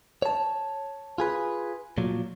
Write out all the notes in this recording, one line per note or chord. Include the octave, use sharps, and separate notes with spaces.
C#5 A5
F4 G#4 B4
A#2 F3 F#3